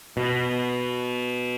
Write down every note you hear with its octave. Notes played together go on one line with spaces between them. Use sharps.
B2